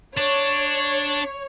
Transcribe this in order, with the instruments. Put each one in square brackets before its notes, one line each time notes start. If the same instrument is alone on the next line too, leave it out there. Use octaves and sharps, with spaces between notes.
[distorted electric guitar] D4 [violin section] C#5